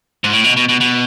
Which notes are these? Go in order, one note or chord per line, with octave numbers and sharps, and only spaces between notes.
G#2
A2
B2
B2
B2
B2